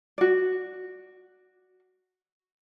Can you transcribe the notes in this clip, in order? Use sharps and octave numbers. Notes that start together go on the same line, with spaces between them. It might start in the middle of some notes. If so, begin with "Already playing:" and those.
F#4 D5